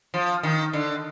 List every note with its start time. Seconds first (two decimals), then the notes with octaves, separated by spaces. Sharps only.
0.14 F3
0.43 D#3
0.73 D3